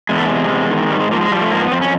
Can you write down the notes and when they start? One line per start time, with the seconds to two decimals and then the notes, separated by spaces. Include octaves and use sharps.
0.09 E2 G#3
0.18 A3
0.25 C3 G#3
0.50 E2
0.71 D#3
0.90 G#2 G3
1.01 G#3
1.11 F3 A#3
1.21 G#3
1.31 F3 G3
1.41 A3
1.51 G#2 A#3
1.61 B3
1.71 F2 C4
1.81 C#4